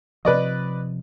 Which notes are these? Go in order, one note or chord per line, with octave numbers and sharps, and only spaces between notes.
C3 F3 B4 D5 D#5